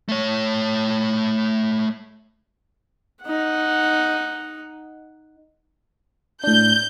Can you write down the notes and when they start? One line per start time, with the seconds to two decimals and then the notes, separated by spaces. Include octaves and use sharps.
0.09 A3 C#5
3.23 D#4 F#5
6.44 A2 D4 G6